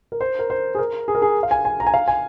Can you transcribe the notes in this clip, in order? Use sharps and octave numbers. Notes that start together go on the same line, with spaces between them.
A#4
C5
A#4
C5
G#4
A#4
G#4
A#4
G#4
F5
G#5
G#5
A#5
G#5
F5
G#5